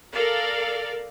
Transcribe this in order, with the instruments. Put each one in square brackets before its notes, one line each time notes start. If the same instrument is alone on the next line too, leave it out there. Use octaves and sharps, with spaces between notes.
[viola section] A4 A#4 D5 F5